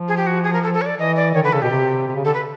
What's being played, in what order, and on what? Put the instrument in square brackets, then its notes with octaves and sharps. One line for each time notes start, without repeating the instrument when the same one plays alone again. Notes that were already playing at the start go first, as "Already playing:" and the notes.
Already playing: [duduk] F3
[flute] G#4
G4
F#4
G#4
A#4
A4
A4
C#5
D5
[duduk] E3 [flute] D#5
[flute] D5
[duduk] D#3 [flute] C#5
[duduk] D3 [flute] B4
[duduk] C#3 [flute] A4
[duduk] B2 [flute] G4
[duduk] C3
C3
C#3
[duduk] D3 [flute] A4
[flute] B4